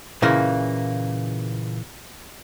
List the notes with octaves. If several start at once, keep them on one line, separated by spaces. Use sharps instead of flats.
A#2 C#3 E3 A#3